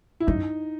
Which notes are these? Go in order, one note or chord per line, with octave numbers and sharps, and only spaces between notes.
E4
F#2 D#4